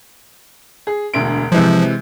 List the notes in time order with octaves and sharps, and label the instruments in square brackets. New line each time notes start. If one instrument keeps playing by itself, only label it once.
[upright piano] G#4
E1 D2 D7
[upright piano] C3 E3 G#3 [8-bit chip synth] F3